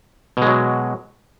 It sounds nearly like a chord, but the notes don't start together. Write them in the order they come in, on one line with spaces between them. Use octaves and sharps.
B2 G#3 F#3